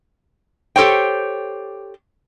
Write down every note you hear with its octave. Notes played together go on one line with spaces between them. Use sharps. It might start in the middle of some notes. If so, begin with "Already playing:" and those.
G4 A4 C5 C#5 G5